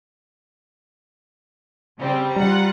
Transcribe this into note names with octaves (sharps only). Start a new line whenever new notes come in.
C#3 G3 C4
G3 F4 F#5 A#5